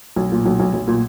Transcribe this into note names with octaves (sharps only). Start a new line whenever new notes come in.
B1
A#2
B1
B1
B1
A#2